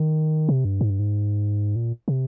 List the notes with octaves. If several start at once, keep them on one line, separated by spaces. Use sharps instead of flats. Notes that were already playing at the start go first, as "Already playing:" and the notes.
Already playing: D#3
C3
G2
G#2
G2
G#2
A#2
C3